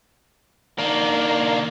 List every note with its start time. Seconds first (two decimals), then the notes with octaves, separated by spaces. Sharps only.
0.79 D#3 A#3 D4